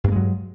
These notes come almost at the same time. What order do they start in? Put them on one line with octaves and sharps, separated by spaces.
G2 A#3 G#3 F#3